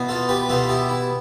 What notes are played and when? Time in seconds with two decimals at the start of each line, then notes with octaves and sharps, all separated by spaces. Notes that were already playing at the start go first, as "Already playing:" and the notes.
Already playing: E2 B2 B3
0.09 F4 A4
0.29 G4 B4
0.49 E2 B2 B3 F4 A4
0.69 E4 G4
0.89 E4